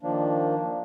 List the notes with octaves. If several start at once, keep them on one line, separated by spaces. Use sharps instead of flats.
D#3 F3 A#3 D4